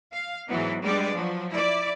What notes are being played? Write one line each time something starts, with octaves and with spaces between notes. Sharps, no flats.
F5
G#2 E3 F#3 B3
G3 G#3 B3 D4 D5
F3 F#3
E4 D5